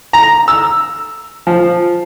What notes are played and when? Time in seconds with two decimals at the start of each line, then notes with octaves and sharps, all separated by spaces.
0.13 A#5
0.48 E6
1.47 F3